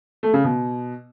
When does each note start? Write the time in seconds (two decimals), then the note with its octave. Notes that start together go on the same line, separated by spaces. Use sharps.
0.23 A3
0.34 C#3
0.44 B2